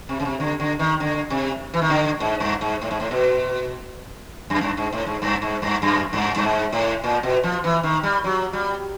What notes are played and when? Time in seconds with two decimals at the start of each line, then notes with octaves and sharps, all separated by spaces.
0.09 C3
0.20 C#3
0.25 C3
0.40 D3
0.60 D3
0.79 D#3
1.00 D3
1.30 C3
1.74 E3
1.82 D#3
1.90 D3
2.20 G#2
2.40 G2
2.61 G#2
2.82 A2
2.91 G#2
3.00 A2
3.11 B2
4.50 F#2
4.61 G2
4.77 G#2
4.93 A2
5.06 G#2
5.22 G2
5.42 G#2
5.62 G2
5.82 F#2
6.13 G2
6.36 G2
6.43 G#2
6.73 A2
7.04 A#2
7.23 B2
7.43 F3
7.64 E3
7.83 D#3
8.03 G3
8.24 F#3
8.53 G3